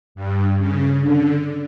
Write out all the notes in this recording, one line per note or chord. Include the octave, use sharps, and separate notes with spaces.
G2
C#3
D3